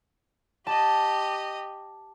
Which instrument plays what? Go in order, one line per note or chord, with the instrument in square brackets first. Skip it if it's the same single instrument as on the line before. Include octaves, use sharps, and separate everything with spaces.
[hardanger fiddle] G4 D#5 [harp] A5